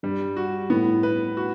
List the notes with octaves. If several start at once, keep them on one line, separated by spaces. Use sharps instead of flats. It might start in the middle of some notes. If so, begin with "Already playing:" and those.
G2 G3
F#4
A2 B3
B4
F#4